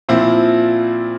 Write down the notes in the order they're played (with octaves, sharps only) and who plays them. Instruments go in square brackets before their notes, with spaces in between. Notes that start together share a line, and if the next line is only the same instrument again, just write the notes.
[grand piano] A#2 F3 C4 E4